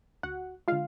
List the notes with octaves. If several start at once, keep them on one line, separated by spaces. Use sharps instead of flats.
D2 F#4 F#5
D3 G#3 F4 F5